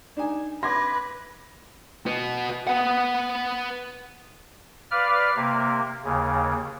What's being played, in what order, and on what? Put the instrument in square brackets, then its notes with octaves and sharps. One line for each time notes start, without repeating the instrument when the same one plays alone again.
[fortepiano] D4 D#4 G#5
[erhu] B4 [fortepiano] C6 [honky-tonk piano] D6 G#6 A#6
[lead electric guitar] F#4 B4
B4 F#5
[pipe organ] B4 D5 F5 F6
C3 A#3
D#2 C#3